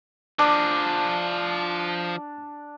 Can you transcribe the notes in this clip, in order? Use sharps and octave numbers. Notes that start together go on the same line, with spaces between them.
F3 D4 G#4 D6